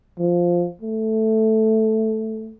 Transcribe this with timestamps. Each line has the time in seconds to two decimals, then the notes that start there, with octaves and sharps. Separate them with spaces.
0.19 F3
0.82 A3